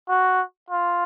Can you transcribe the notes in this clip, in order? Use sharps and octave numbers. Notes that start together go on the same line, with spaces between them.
F#4
F4